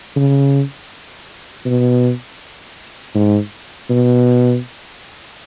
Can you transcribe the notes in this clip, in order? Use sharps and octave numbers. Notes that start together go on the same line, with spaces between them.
C#3
B2
G#2
B2